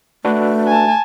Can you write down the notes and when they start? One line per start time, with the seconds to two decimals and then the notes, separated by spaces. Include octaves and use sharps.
0.25 A3 D4 F#4 B4
0.67 G#5 A5